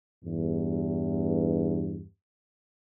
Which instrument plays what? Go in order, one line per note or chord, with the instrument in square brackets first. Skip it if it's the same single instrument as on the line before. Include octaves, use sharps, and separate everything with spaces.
[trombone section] E2 G2